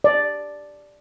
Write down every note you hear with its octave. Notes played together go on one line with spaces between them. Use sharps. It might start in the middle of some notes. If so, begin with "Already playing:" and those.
D5